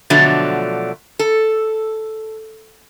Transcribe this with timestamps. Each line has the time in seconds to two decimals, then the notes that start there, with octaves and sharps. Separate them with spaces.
0.10 B2 D3 F3 F#3 A3 D4
1.19 A4